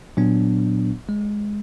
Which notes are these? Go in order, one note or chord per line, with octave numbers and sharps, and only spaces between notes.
A#2 F#3 B3 D4
G#3